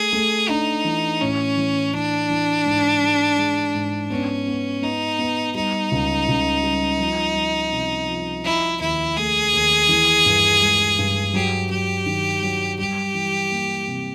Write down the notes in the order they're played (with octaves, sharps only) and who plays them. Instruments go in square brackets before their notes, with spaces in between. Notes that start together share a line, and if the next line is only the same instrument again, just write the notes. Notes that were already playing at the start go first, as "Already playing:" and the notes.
Already playing: [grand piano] A3 [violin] G#4
[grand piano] A3
[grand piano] D4 [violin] D#4
[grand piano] E3
[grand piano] A2 [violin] C#4
[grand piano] E3
[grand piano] E3 [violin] D4
[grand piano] E3
G#2
G#3
G#3
G#2
[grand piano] B3 [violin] C#4
[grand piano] B3
[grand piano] B3 [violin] D#4
[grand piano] B3
[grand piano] G3 [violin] D#4
[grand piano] C#2
C#2
G3
F3
F3
C3
F3
[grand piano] F3 [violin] E4
[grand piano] D#2 [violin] E4
[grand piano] A3 [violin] G#4
[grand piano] D#2
E3
G2
G#3
G2
[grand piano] F#3 [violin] G4
[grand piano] F#3 [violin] G4
[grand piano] D#3
F#3
[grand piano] G3 [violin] G4
[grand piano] E3
A#3
C3